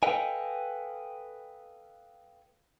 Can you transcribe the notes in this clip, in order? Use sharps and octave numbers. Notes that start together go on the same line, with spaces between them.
A4 B4 D#5 F5 G5 G#5